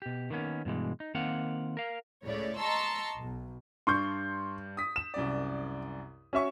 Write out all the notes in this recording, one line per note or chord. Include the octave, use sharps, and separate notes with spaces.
B2 G4
D#3 A#3 B3 C#4
G2 B2 E3 G#3
D#4
D#3 A#3 C4 F5 F#5
A#4 F5
C#2 A2 C#3 C#5 D5
D#5 A5 A#5 C6 C#6 E6
B1
G2 D4 C6 C#6 G6
D#6 B6
E7
C2 F#2 D5
C#4 F#4 E5 C#6